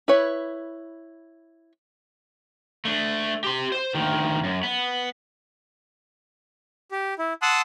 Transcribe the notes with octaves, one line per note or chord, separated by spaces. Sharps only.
E4 B4 C#5
A3 D4
G4 C6
C5
D2 D#3
F#2
B3
G4
E4
F#5 A5 C6 D#6 E6 F#6